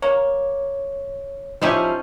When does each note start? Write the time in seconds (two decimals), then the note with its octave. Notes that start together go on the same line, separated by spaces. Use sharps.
0.02 A#3 C#5
1.62 F3 C4 C#4 D#4 E4 G4 C5